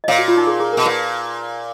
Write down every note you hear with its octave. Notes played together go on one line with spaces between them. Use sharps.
D#5
A#2 C#5 F5
F#4
F4
D#4
G#4
G#4
B2 A#4
A#2 B4